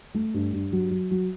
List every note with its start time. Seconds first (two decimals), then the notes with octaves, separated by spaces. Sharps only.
0.14 A3
0.34 G2
0.53 G2
0.72 F#3
0.91 F#3
1.11 F#3